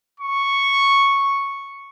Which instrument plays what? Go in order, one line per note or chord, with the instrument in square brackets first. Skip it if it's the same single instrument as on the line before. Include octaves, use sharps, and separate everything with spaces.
[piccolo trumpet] C#6